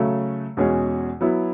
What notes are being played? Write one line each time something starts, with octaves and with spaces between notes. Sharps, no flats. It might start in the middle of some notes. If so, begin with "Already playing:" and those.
Already playing: C#3 F#3 A3
E2 B2 G#3 C#4 G#4
F#3 B3 E4